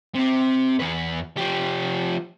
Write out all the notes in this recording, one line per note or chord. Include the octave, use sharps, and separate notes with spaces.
C3 C4
E2 B4
F3 G4